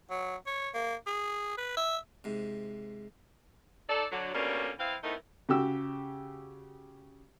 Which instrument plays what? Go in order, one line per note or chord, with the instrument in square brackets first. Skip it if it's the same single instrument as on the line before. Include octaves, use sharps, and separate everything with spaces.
[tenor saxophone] F#3
C#5
A#3
G#4
B4
E5
[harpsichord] G#2 C3
[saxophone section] D#4 A4 D5
D3 F#3
B2 D3 G3 A#3 C#4
E3 C4 E4 F5
A3 B3 C4 D#4 E4 A#4
[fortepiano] C#3 F#4 G4 E6